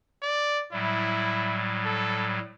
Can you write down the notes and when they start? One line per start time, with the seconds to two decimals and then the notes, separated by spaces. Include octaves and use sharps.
0.22 D5
0.72 A2 F#3 G3 E4
1.85 A4